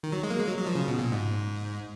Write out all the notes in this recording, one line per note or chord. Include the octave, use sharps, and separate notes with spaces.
D#3
F#3
G#3
A#3
G#3
F#3
F#3
F3
C#3
B2
A#2
G#2